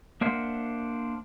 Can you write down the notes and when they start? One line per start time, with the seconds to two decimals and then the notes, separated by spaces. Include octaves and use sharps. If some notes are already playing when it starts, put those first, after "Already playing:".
0.21 A#3 D4 A#4 C5 E5 F#5